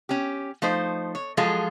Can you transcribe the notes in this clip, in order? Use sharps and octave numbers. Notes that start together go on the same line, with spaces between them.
C#4 G4
F3 A3 D#4 C5
C#5
F3 F#3 G#3 F4 G#4 A4